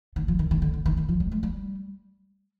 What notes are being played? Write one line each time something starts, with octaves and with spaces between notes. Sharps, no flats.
D#3
F3
D#3
D#3
D3
D3
D#3
D#3
F3
G3
G#3
G3